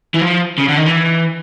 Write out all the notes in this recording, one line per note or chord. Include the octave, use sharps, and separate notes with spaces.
E3
F3
C#3
D3
D#3
E3